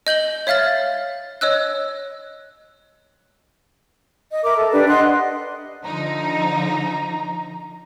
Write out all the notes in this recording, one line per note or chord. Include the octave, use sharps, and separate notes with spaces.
D#5 G6 F#7 G7
C#5 E5 F5 F6 A6
C#5 D#5 E6 F#6
D#5
A#4 E5 D6
A4
D4 G4 B4 D5
D#5 F#5 C6 F#6
D3 F3 D#4 A#5